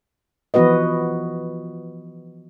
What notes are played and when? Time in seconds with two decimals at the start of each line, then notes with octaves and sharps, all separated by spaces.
0.54 E3 F3 B3 F#4 B4 D#5